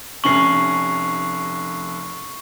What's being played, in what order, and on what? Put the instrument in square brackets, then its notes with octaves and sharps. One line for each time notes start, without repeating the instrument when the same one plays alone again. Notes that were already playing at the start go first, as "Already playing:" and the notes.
[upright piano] F1 C#4 F#7 [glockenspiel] C#6 C7